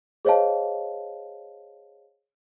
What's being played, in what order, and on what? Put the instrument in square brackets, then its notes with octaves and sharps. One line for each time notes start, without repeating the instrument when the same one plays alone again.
[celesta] G#4 C5 C#5 D#5 F5 A5